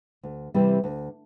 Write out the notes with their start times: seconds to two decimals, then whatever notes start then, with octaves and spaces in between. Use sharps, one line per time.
0.23 D2
0.54 C3 E3 G3 C4
0.84 D2